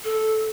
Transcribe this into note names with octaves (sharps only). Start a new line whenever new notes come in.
A4